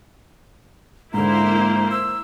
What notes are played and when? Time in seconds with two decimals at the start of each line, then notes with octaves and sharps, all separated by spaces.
1.14 G#2 D3 A#3 E4 C5 A#5
1.91 E6